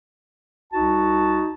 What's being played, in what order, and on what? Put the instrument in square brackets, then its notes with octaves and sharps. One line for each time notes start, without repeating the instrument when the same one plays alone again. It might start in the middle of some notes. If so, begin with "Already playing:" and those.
[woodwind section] C2 D#4 F#4 A5